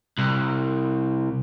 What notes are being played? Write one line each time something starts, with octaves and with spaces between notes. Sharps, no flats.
C2